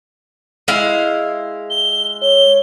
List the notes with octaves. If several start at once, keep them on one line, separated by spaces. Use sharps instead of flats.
G#3 E4 F5
G7
C#5 G7